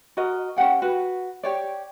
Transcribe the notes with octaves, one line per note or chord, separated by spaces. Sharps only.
F#4 A#4 D#5
C#4 G4 F#5 G5
F#4 B4
G4 C#5 D5